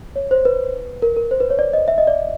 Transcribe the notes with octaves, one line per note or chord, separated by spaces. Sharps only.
C#5
C5
B4
A#4
A#4
C5
B4
C#5
D5
D#5
E5
D#5
D5